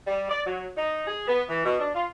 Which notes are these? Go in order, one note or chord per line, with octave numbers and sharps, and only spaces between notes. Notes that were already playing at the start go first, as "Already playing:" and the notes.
G3
D5
F#3
D#4
G#4
B3
E3
B2
D4
F4